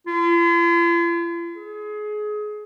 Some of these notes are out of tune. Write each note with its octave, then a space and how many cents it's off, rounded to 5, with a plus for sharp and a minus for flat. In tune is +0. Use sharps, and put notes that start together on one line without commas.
F4 -45
G#4 +25